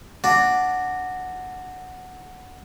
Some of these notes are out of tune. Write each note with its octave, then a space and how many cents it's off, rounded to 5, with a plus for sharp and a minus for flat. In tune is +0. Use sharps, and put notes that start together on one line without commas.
D4 +0 F#4 -5